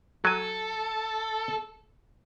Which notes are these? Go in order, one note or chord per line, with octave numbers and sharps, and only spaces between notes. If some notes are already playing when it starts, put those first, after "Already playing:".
F#3 A4 G#5